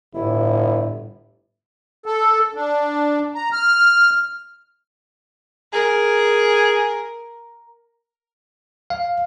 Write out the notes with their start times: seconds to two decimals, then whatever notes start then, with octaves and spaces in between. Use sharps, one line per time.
0.14 G1 A2 E4
2.06 A4
2.55 D4
3.35 A#5
3.53 F6
5.73 G#4 A#4
8.90 F5